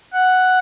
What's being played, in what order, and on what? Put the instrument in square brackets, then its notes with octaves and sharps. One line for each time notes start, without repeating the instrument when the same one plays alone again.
[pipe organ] F#5